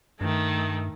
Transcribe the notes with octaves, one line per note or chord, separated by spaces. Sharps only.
G2 D#3 A3